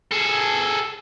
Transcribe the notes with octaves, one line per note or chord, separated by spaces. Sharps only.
G#4 A4